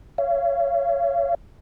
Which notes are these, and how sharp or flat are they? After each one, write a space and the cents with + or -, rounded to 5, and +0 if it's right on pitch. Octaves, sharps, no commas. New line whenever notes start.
C#5 +15 F5 -40